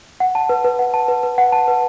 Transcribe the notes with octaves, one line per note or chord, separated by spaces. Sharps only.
F#5
A5
B4
B4
F#5
A5
B4
B4
F#5
A5
B4